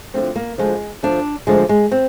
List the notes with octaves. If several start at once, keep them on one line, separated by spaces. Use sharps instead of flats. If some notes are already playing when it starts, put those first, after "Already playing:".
D2 D3 F3 C4
A#3
D2 D3 F3 G#3
D2 D3 F3 D4
D2 D3 F3 G#3
G#3
C4